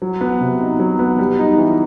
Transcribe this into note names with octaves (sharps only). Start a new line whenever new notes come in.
F#3
B3
C3
D#4
F#3
B3
G3
D#4
E3